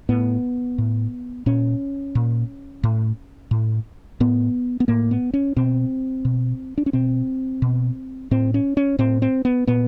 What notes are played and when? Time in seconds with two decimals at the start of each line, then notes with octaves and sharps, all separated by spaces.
0.09 A2 B3
0.78 A2
1.46 A#2 C#4
2.15 A#2
2.84 A2
3.51 A2
4.20 A2 B3
4.80 B3
4.88 A2 A#3
5.11 B3
5.34 C#4
5.57 B2 C4
6.25 B2
6.78 D4
6.86 C#4
6.93 B2 C4
7.62 B2
8.31 A2 C4
8.54 C#4
8.77 C#4
8.99 A2 C4
9.22 C4
9.45 B3
9.67 A#2 B3